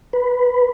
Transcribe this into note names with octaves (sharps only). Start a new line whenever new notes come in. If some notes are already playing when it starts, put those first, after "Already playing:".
B4